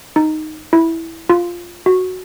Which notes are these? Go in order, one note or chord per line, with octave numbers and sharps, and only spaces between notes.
D#4
E4
F4
F#4